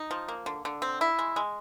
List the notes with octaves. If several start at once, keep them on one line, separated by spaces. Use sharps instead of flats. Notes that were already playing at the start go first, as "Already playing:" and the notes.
Already playing: D#4
F3
A#3
D3
D3
C4
E4
G#3
G#3